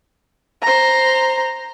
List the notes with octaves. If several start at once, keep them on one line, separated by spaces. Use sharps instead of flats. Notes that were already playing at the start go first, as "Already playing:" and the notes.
C5 A#5